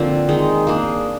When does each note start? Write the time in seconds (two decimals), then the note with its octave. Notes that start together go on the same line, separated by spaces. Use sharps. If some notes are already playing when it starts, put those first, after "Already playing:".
Already playing: D3 F3 A#3 C4 A#4
0.29 D#3 G#3 D#4
0.67 A#3 D4 G#4